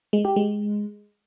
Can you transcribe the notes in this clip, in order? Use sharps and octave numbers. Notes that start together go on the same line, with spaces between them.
G#3
G4
G#3